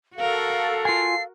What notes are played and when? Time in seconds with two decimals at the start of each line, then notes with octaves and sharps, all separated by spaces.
0.16 F#4 A4 A#4 F5
0.85 F4 G#5 C7